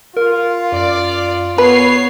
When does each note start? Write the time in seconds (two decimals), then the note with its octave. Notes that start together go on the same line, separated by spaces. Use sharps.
0.17 F4 A#4
0.72 F#2 D5
1.58 B3 B4 C#5 B5 C7